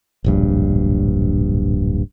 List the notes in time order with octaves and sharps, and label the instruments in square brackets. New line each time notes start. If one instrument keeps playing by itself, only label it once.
[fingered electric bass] D1 A#1 G2